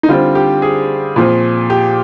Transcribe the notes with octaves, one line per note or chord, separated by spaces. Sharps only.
D#4
D3 G3 C4 F4
G4
G#4
A#2 F3 C4
G4